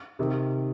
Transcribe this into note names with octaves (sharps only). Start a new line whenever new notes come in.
C3 D#3